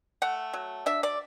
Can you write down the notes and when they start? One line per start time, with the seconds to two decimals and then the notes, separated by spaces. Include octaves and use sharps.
0.22 A3 F#5
0.53 F#3
0.86 D4 E5
1.03 D5